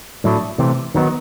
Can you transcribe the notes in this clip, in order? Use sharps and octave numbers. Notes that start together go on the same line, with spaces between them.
A2 F#3 A3 D4
C3 E3 A3 C4
D#3 F#3 B3 D#4